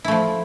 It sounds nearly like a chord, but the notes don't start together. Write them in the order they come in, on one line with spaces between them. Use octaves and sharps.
E4 A3 F3